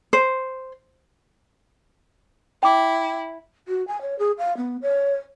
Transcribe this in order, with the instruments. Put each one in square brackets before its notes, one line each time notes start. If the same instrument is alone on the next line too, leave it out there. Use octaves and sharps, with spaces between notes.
[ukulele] C5
[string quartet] E4 [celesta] G5 D6
[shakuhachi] F#4
G#5
C#5
G#4
F5
B3
C#5